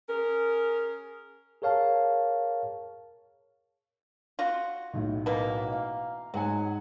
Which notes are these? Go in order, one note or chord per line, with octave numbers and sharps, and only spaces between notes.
C#4 G#4 A#4
G#4 A#4 C#5 F5 A5
F4 F#4
B1 A2
B2 E3 A#3
F5
G#2 F#3 F#5 G#5